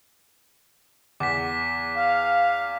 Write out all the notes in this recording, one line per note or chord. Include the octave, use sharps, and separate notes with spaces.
E2 D6 B6
F5